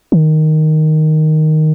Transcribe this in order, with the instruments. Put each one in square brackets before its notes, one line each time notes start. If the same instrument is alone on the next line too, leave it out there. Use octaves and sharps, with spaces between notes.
[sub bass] D#3